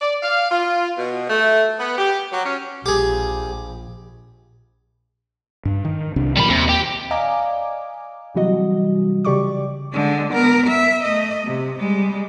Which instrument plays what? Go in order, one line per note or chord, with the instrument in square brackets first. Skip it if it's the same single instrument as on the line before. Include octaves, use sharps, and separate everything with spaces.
[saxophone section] D5
F5
F4
B2
A3
B3
G4
F#3
C#4
[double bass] A#1 [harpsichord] G4 G#4
[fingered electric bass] G2
D#3
C2 C3 D4
[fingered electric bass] A#2 D#3 F#3 [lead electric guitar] G3 B5
[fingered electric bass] D#2 [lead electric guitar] C3
[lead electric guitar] G4
[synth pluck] D5 D#5 F5 G#5 A#5 D6
C3 E3 F#3 G3 F#4 D#5
C#3 G4 D5 C#6 D6
[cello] D3 G#3
B3 A#4
E5
A3 D#5
C3
G3 G#3